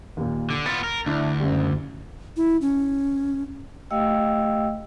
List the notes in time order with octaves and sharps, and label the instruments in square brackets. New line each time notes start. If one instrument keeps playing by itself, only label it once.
[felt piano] D#2 A#2
[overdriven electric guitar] D3
[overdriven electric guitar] B3 F4 [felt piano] A6
[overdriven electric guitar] A#4
[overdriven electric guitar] D2 [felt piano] D4 E4
[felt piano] F#1 F#2 G3
[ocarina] E4
C#4
[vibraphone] A3 G4 D#5 F5 G5 E6